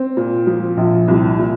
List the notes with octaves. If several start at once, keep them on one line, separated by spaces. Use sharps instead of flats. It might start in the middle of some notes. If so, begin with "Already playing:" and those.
Already playing: C4
A#2
F3
A#1
C2
A#2